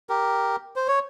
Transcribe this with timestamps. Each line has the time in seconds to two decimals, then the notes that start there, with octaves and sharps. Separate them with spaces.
0.09 G4 A#4
0.76 C5
0.88 C#5